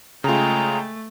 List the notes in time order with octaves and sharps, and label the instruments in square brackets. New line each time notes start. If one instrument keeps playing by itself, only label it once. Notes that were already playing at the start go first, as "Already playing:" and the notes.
[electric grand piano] C#3 F4 [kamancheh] G#3 G5 [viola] A3 [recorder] A#5